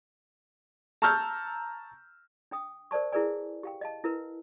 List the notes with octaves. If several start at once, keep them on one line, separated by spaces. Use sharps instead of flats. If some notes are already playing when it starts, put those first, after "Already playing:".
A5 A#5 C#6 E6 F6 G6
D4 G5 D#6
A#4 C5 D5 A5 C#6
E4 G#4 A#4 B4 D5 G#5
G4 F5 G5
D#5 F5 A5
E4 A#4 B4